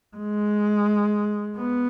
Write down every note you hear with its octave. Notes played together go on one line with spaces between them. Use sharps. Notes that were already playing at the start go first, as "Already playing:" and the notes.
G#3
B3